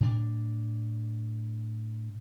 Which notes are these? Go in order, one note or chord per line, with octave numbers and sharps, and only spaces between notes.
A2 D4